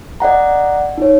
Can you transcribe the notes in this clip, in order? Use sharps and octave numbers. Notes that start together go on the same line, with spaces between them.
D5 D#5 F#5 A#5
D#4 C#5